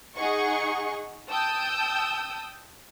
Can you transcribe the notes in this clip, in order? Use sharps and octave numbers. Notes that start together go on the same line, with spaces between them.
D#4 G#4 D#5 F#5 G#5 C#6
G5 A5 D#6 E6 G6